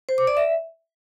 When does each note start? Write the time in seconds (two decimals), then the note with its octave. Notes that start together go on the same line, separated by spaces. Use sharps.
0.09 C5
0.18 D6
0.27 D5
0.37 E5